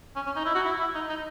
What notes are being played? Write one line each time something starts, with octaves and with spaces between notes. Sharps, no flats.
C#4
C#4
D#4
E4
F#4
E4
E4
D#4
D#4